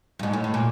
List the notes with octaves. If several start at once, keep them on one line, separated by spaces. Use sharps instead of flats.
G2
G#2
A2
A2
A#2